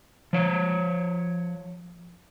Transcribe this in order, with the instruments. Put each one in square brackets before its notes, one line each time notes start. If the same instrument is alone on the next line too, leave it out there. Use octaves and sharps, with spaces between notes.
[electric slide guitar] F3 C#5